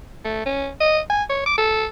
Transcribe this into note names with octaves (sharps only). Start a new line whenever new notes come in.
A3
C#4
D#5
G#5
C#5
D6
A4